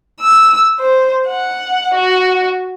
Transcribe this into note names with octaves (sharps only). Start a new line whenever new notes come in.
E6
C5
F#5
F#4